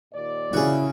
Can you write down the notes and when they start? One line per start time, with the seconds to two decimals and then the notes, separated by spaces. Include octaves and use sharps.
0.14 D#2 A#2 D5
0.53 C#3 E4 F#4 G#4